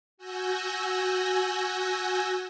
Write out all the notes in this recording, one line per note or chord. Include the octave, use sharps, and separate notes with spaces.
F#4 G#5 E6 F#6 G6 A#6